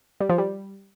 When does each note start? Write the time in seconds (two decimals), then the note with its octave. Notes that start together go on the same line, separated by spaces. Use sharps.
0.20 G3
0.29 F3
0.38 G3